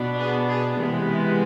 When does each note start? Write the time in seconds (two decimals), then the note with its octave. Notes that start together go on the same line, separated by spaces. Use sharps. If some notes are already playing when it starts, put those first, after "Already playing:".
Already playing: B2 B3 D4
0.20 G#4 B4
0.48 G#4
0.76 C3 E3 G#3 B3